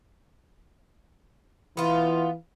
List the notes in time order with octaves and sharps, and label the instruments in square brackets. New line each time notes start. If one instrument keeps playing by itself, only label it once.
[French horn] E3 [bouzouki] B3 F4